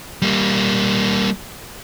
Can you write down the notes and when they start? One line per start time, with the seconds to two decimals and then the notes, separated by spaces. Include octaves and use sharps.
0.22 G3 A#3